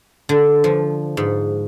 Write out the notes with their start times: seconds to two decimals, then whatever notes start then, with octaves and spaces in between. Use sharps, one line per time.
0.29 D3
0.64 F3
1.17 G#2